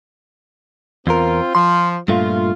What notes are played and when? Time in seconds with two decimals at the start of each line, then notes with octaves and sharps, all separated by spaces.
1.07 E2 C4 F4 A#4
1.55 F3 C6
2.08 G2 A#2 A3 F4